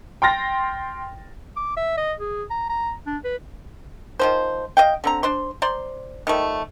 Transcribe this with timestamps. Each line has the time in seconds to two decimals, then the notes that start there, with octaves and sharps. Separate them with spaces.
0.22 G5 C6 F6 A6 A#6
1.56 D6
1.77 E5
1.97 D#5
2.19 G#4
2.50 A#5
2.70 A#5
3.06 D4
3.24 B4
4.19 D#3 F3 C5
4.77 D#5 F5 G5
5.04 D3 C4 A#5
5.23 D4 C5 C6
5.62 C5 D5 A#5 C6
6.27 D#3 F3 G3 A3